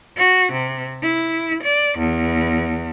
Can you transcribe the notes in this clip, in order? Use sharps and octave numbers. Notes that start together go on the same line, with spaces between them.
F#4
C3
E4
D5
E2